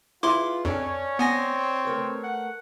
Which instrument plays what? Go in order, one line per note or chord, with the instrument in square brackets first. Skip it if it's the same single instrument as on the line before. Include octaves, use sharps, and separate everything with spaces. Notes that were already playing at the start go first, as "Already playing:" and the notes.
[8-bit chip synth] E4 C6 D6 [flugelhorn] F4 [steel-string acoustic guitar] G#4 B4 E5
[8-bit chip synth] F2 [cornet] C#4 [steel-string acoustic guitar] D4 [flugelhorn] C#5
[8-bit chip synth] B3 G#5 A#6 [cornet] C4
[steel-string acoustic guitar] A3 A#4 B4
[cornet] F#5